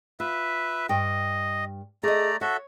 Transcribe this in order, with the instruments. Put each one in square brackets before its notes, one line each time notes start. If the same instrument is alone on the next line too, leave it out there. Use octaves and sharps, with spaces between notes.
[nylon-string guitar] F4 [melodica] B4 E5
[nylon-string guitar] G2 G5 [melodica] D#5
[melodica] A3 D5 A#5 [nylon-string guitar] G#4 D#5
[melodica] F#4 A4 E5 [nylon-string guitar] C#5